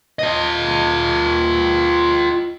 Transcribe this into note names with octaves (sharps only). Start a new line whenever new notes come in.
F4 D#5